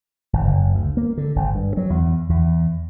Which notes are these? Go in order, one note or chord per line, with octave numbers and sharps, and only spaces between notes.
G#1
F#1
D2
A#3
D3
G#1
G2
F#3
E2
E2